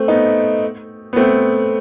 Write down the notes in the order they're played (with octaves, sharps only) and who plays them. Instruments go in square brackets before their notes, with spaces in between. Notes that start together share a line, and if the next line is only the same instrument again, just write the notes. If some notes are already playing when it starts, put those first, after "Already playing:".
Already playing: [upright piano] A3 C4
B3 D#4
B3
A3 C4